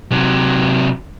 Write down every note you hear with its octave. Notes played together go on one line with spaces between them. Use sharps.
C3 F#3